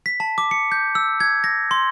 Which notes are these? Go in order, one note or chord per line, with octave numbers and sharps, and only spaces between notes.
B6
A5
D6
C#7
G6
E6
G#6
A#6
C6